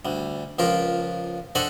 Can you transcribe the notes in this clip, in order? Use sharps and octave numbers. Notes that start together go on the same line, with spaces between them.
D2 G3
C#2 F3 F4 G4 A#4
D4 G4 A4 C5 D#5 F#5